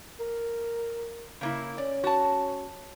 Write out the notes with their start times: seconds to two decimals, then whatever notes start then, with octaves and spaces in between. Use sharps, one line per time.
0.20 A#4
1.41 C#3 A#3 E4
1.78 C#4 D5
2.04 F#4 A5